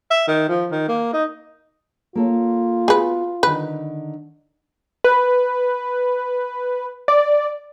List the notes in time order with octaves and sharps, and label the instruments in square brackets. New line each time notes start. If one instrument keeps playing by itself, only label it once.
[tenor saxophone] E5
D#3
F3
D#3
A#3
D#4
[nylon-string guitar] A#3 A4 C#5 [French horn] F4
[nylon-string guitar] B3 F#4 [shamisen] G#4 B4
[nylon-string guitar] D3 D#3 [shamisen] B4
[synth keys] B4
D5